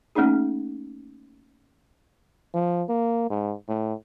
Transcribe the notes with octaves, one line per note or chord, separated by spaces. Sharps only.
A3 A#3 C#4 D#4 G#4
F3
A#3
G#2
A2